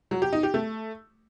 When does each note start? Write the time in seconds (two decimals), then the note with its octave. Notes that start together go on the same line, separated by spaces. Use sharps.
0.11 F#3
0.22 G4
0.33 D#4
0.43 G4
0.54 A3